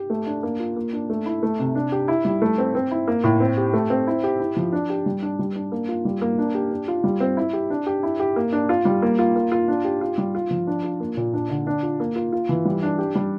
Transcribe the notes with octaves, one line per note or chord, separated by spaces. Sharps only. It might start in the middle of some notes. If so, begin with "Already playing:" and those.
Already playing: G4
A3
D4
A#3
F4
A#3
D4
A3
E4
A3
C3
D4
G4
E4
G3
A3
C4
C4
E4
A#3
A2
C4
G4
A3
C4
E4
G4
E4
F3
D4
G4
G3
D4
G3
D4
A#3
F4
G3
A#3
D4
G4
D4
F4
G3
C4
E4
G4
D4
G4
E4
G4
A#3
D4
F4
G3
A#3
F4
A#3
F4
D4
G4
F4
G3
F4
F3
D4
F4
A#3
A#2
D4
D3
D4
F4
A#3
F4
F4
E3
G3
D4
G4
G3